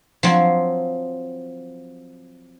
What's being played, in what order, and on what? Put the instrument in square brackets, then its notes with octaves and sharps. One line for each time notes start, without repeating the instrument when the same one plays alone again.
[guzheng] F3 F#3 C4